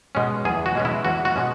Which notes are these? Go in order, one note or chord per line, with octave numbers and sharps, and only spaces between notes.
B2 G#3 C#4
E2 G#4
F#4
B2 G#3 C#4
E4
E2 F#4
F#4
B2 G#3 C#4